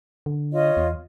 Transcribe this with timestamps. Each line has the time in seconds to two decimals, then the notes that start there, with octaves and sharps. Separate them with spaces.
0.26 D3
0.52 F4 C#5 D#5
0.77 E2